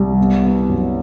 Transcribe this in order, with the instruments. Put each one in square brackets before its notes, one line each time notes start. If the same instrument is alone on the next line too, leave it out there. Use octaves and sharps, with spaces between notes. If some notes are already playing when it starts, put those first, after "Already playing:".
Already playing: [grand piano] C2 G3
B3
B3
F#2